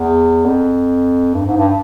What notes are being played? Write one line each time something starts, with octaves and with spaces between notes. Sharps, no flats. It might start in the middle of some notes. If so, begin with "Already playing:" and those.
Already playing: E2
F2
G2
G#2
G2